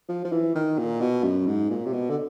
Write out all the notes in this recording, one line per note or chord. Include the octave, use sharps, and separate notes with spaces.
F3
F3
E3
D#3
A#2
B2
F#2
G#2
A#2
C3
B2
D3